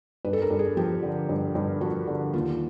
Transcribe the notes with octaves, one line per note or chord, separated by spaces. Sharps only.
G2 B4
A4
A#4
G2
G#4
F3 G4
D3
G2
G2
F3 F#4
D3
D#2 F4